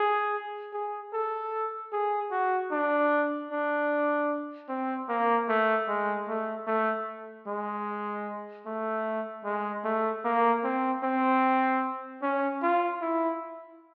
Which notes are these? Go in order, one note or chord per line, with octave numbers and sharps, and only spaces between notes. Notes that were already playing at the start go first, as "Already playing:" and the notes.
Already playing: G#4
G#4
A4
G#4
F#4
D4
D4
C4
A#3
A3
G#3
A3
A3
G#3
A3
G#3
A3
A#3
C4
C4
C#4
F4
E4